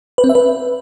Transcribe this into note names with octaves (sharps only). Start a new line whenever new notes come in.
B4
C4
E5
B4